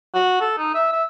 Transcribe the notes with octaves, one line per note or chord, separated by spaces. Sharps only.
F#4
A4
D#4
E5
E5